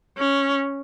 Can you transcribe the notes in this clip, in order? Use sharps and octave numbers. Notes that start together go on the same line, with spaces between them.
C#4